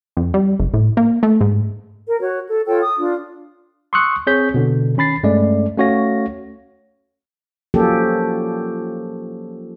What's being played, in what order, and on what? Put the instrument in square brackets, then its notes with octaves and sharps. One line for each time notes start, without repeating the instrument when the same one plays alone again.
[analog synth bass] F2
G3
F#1
A2
A#3
A3
G#2
[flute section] A#4
F#4 C#5
A4
F4 A4 C#5 G5
D#6
D4 F4
[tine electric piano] C6 C#6 D#6 E6 F#6 C#7
C4 G#4 C#5 G6 B6
B2 D3
D#3 C#4 B5 A6 C7
G2 G#3 A3 C#4 D5
A3 C#4 F#4 C#5 F5 A#6
[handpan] F3 F#3 A#3 C#4 G4 A4